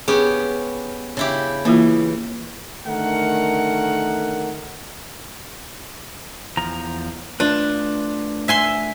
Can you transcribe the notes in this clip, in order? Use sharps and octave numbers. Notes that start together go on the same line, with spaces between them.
B3 C#4 G4 G#4
C#3 E4 G4
E3 A#3 E4 F4
D3 D#3 A3 A#4 F#5
E2 F3 A#5
A3 D4 F4 B4
E5 G#5 C6